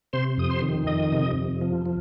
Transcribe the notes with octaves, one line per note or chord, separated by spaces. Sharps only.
C3 C5 C6
F2 D#6
C5 C6
D#3
F2 D#5 D#6
C3
F2
F3
F3